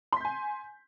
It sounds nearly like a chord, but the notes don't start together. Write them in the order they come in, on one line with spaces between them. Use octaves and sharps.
C6 B6 G6 G#5